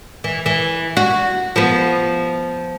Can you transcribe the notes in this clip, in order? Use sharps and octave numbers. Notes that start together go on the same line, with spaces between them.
E3
E3
F#4
F3 B3